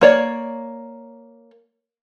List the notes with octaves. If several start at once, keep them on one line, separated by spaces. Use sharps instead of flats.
A#3 C#5 D5